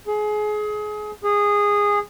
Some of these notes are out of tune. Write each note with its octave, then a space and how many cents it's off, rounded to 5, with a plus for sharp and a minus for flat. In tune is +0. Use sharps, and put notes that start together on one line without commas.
G#4 +25
G#4 -15